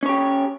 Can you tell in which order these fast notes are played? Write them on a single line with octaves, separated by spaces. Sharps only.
C#4 C#5 G4